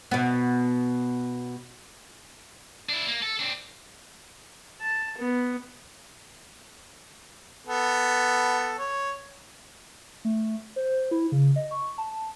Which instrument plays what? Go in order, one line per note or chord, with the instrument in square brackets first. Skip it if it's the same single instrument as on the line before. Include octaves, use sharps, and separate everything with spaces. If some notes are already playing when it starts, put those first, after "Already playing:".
[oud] B2 B3
[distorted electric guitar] D4 E4
A#3
A4
C4 D4
[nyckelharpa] A5
B3
[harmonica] B3 A4
C#5
[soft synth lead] A3
C5
E4
C#3
D#5
C#6
A5